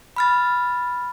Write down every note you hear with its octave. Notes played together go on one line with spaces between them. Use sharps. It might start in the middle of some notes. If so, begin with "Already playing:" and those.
B5 F6 A6